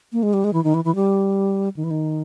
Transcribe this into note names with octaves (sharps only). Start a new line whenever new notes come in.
A#3
G#3
G3
G#3
E3
D#3
E3
E3
G3
D#3
E3
D#3